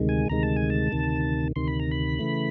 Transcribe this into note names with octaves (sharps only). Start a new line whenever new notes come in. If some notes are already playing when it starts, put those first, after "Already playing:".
Already playing: D2 C3 D#3 G#3
G#5
D2 C3 D#3 G#3 A#5
A5
G#5
A5
D2 C3 D#3
D2 C3 D#3 C6
B5
A#5
B5
C#3 E3 A3